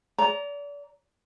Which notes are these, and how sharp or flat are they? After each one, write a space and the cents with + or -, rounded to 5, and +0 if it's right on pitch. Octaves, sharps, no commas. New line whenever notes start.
D5 -35 A#5 +0